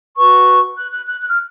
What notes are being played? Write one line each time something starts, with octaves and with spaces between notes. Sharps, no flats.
F#4 B4 C#6
F#6
F#6
F#6
F#6
F6